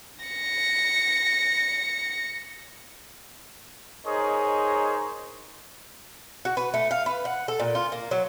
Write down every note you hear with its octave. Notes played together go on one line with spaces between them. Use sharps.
A#6 C#7
D#4 G#4 A#4 C5 C#5 D#5
F#4
B4
A3
F5
B4
F#5
A4
A#2
F4
A#3
F#3